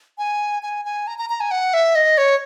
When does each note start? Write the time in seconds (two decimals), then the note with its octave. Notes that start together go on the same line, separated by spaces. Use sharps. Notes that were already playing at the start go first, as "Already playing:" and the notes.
0.18 G#5
0.63 G#5
0.85 G#5
1.07 A#5
1.18 A#5
1.29 A#5
1.40 G#5
1.51 F#5
1.74 E5
1.95 D#5
2.18 C#5